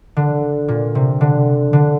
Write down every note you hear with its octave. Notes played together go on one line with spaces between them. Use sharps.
D3
A#2
C3
D3
D3